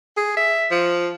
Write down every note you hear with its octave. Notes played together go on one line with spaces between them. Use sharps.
G#4
E5
F3